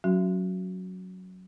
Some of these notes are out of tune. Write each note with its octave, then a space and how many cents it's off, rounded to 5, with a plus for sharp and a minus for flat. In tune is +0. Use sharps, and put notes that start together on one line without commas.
F#3 +0 C#4 +0 F#4 +0